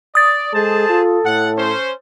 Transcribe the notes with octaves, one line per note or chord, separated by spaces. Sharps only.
D5 D#6 A6
G#3 G#4 A4 C5 A5
F4
A2 F#5
C#4 C5